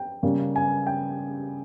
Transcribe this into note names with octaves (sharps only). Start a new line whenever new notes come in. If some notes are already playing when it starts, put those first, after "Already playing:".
Already playing: G5
C#3 G3 A#3
G#5
G5